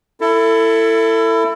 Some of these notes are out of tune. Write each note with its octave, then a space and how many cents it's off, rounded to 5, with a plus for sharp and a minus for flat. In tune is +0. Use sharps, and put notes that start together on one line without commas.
E4 +15 A4 +25